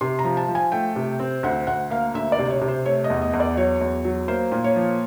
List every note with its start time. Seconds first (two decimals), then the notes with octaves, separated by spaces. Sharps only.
0.01 C3 C6
0.19 A#5
0.24 F3
0.37 A5
0.48 F3
0.55 G#5
0.72 A3 G5
0.96 C3
1.20 C4
1.43 D2 F#5
1.67 D2 F#5
1.90 A#3 F5
2.14 D2 E5
2.32 D5
2.39 C3
2.50 C#5
2.62 C3
2.68 C5
2.85 A3 C#5
3.04 D#5
3.10 E2
3.22 D#5
3.33 E2
3.40 D5
3.57 F#3 C#5
3.81 E2
4.05 F#3
4.28 A#3 C5
4.52 A#2
4.64 C#5
4.76 F3